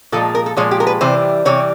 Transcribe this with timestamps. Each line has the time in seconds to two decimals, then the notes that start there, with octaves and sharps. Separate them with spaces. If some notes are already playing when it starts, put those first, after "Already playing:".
0.12 A#2 F3 G#3 A4
0.35 A#4
0.46 A4
0.57 A#2 F3 G#3 C#5
0.71 G4
0.80 A#4
0.87 B4
1.01 C3 E3 G3 C5
1.45 C3 E3 G3 C#5